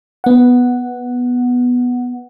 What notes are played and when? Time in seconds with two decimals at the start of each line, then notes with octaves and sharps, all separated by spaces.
0.24 B3 F#5